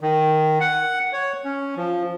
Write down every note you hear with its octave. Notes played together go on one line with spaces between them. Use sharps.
D#3
F#5
C#5
C#4
F3